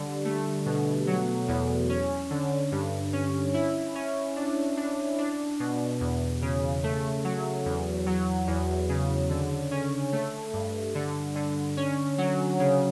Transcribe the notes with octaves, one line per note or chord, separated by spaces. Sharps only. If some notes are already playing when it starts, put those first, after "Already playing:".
Already playing: D3 G3
A3
B2
F#3
E2
C#4
D3
G2
C#4
E4
C#4
D4
D4
D4
B2
E2
C#3
A3
F#3
E2
F#3
E2
C#3
D3
C#4
A3
G2
D3
D3
C#4
F#3
C#3